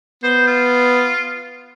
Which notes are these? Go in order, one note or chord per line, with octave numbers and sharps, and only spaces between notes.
B3 C5
F4